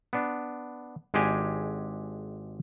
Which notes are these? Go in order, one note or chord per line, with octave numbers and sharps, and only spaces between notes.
B3 D4
G#1 G#3 D4 G4 G#5